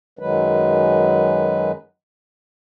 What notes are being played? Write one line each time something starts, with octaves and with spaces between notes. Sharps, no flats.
F#2 D#3 F#3 G#3 B4